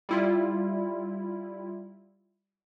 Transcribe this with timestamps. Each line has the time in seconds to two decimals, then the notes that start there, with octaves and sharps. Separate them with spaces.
0.09 G3 E4 F4